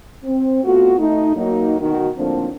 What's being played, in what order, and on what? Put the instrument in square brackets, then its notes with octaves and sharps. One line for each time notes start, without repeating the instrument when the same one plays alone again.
[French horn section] C4
A3 B3 F4 F#4
A3 D#4
F#3 A#3 D#4
D2 B2 D#3 D#4 F#4
D2 A2 F3 A#3 C4 D4